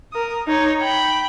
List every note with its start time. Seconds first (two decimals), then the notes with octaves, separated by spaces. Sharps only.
0.13 A#4 D#6
0.47 D#4 C#5
0.81 G5 B5